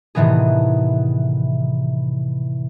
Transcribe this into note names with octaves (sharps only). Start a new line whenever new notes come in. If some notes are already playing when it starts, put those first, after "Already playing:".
A2 C3 D#3 E3 B3 G#4